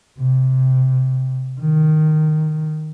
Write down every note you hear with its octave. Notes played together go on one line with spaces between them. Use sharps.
C3
D#3